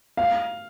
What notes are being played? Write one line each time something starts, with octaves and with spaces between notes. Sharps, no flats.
F5